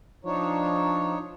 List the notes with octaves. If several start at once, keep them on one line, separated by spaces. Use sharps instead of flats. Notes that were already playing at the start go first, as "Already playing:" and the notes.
F3 D4 D#4 C#5